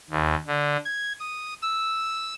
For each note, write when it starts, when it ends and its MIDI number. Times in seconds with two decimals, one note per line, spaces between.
0.10 0.35 39
0.47 0.77 50
0.85 1.13 92
1.20 1.54 87
1.62 2.34 88